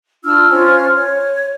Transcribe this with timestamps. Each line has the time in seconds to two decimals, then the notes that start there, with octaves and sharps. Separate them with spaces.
0.24 D4 F4 E6 F6
0.51 C#4 F4 C5 F6
0.93 C#5